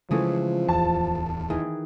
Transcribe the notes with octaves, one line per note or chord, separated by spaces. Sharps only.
C#3 E3 F3 G#3 A3 C#4 G#4
D1 E2 A5
D#3 E3 G#4